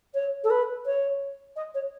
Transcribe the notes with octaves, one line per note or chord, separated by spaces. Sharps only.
C#5
A4
B4
C#5
D#5
C#5